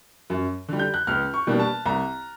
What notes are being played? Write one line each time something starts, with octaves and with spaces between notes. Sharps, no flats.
F#2
D3 G3
G6
F#6
C#2 F6
C#6
B2 G3 A#3 D4
A5
C2 A#5